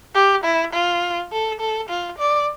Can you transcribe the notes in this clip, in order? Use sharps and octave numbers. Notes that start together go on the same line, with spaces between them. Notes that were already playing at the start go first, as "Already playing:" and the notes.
G4
E4
F4
A4
A4
F4
D5